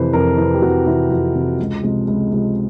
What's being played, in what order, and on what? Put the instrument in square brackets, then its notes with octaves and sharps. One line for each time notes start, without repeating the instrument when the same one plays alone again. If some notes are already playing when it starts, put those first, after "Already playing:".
Already playing: [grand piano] F2 C3 E3 B4 C5
F2 A#4
C3 E3
G4
F2 F#4
C3 E3 E4
F2 F4
C3 E3
C#2
C3 F3 G#3
C#2
C3 F3 G#3